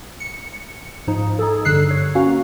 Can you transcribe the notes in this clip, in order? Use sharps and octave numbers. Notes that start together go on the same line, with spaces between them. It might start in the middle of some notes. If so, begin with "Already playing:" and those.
C#7
G#2 F3 D#4
D#4 G#4 A4
G2 D3 E6 F#6 C7
C#5
A#3 C#4 F#4 F5